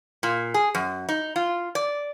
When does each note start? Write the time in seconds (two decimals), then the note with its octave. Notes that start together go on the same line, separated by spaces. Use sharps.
0.23 A#2
0.54 G#4
0.75 F#2
1.09 D#4
1.36 F4
1.75 D5